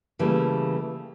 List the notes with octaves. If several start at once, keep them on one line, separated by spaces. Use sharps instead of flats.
C#3 E3 G3 A3 A#3